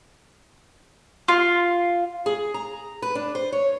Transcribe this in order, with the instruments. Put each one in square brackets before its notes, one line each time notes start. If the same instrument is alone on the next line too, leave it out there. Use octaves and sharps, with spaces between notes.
[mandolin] F4
[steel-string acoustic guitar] G#4
A#5
B4
D4
C5
C#5